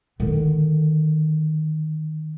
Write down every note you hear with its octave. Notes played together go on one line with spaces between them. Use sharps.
D3 D#3